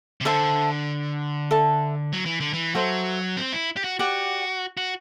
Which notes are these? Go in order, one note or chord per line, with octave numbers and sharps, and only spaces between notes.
C3
D3 A4 C5 E5 A5
A4 E5 A5
F#3
E3
D3
E3
F#3 F#4 A4 C5 E5
C4
E4
G4
F#4
F#4 G4 D5 F#5
F#4